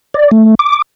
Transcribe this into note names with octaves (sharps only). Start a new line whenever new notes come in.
D5
A3
D6